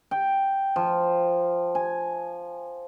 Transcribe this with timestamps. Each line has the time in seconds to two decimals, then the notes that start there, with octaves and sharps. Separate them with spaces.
0.11 G5
0.76 F3
1.75 G#5